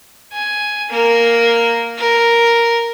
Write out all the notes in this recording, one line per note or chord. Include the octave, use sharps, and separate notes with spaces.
G#5
A#3 A#4
A#4